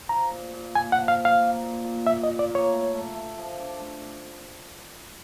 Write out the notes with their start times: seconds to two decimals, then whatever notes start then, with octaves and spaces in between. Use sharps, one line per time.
0.09 F3 A#5
0.31 A#2
0.53 A#2
0.75 A#2 G#5
0.92 F#5
0.97 F3
1.08 F5
1.20 A#2
1.25 F5
1.41 A#3
1.63 A#2
1.84 A#2
2.06 A#2 E5
2.23 D#5
2.28 A#2
2.39 D5
2.50 A#3 C#5
2.72 A3
2.94 A3
3.16 A3
3.38 F3
3.59 D4
3.82 A3